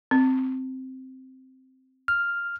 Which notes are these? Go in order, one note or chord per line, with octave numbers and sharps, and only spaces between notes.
C4
F6